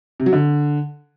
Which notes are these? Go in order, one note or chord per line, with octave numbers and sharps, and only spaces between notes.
C3
F#3
D3